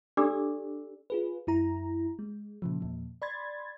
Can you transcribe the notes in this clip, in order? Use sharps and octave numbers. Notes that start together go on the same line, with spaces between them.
D4 G4 A4 D5 D6 E6
F4 G#4 B4
F#2 E4 A#5
G#3
A#2 C#3 F3
E2 A#2 F3
D5 B5 C6 G#6 A6